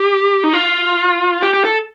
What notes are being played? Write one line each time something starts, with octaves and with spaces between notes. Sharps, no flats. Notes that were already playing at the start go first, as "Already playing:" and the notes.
Already playing: G4
D#4
F4
G4
G4
A4